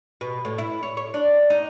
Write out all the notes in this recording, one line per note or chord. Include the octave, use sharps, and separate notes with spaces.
B2
A2
E4
C#5
C#5
D4
D#4